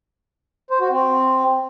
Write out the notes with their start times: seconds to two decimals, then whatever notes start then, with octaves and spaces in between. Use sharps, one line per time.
0.70 C5
0.80 F#4
0.90 C4